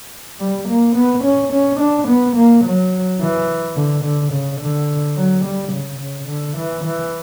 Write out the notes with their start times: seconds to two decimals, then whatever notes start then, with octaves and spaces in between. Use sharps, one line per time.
0.40 G3
0.68 A#3
0.95 B3
1.24 C#4
1.52 C#4
1.79 D4
2.07 B3
2.36 A#3
2.64 F#3
3.20 E3
3.76 D3
4.04 D3
4.32 C#3
4.60 D3
5.16 F#3
5.44 G3
5.72 C#3
6.00 C#3
6.28 D3
6.57 E3
6.84 E3